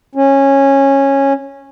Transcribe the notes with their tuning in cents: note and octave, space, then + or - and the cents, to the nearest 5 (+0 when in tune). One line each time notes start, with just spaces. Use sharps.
C#4 -15